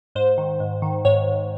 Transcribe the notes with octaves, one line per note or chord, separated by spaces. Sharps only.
G#2 C5
D#3
G#2
D#3
G#2 C#5
G#2